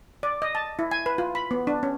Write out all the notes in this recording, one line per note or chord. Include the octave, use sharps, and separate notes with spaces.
D5
D#5
A5
E4
G#5
B4
F4
B5
B3
D4
C#4